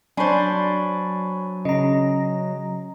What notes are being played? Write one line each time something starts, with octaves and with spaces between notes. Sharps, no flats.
F#3 D4 C5 G#5 B5 C#6
C#3 D#5 A#5